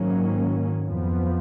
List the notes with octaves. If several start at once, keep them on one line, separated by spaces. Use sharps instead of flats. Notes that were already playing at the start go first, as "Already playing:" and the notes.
Already playing: G#2 D#3 F#3 A#3 C#4
F2 F3 B3